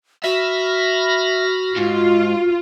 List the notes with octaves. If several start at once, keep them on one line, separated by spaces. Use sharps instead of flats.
F#4 E5 B5 F6 A#6
G#2 F4